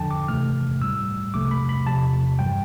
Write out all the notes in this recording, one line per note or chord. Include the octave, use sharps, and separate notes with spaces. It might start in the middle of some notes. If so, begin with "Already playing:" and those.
Already playing: F2 D3 F3 G5 A5
D6
D2 C3 E3 A3 F6
A2 G3 E6
C2 C3 F3 A3 D6
B5
B5
E2 C3 F3 A5
G2 E3 G3 G5